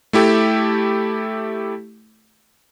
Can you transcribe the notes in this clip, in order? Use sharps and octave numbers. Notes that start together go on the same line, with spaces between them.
A3 E4 G4 A4